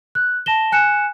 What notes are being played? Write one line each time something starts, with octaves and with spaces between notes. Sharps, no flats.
F#6
A5 A#6 E7 G7
G#5 F#6 C#7 E7